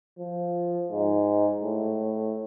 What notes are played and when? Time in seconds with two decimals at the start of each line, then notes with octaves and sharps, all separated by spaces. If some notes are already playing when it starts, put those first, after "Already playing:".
0.19 F3
0.91 G#2
1.63 A2